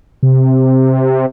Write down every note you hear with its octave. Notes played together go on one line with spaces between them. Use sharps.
C3